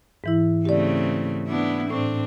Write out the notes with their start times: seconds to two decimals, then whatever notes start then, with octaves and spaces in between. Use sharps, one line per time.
0.24 G#2 E3 E4
0.65 C#3 A3 C4 G4 D5
1.47 B3 D4 E4
1.90 A2 C4 D4 C#6